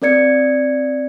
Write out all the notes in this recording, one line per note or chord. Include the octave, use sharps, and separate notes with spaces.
C4 A#4 D5 G#6 C#7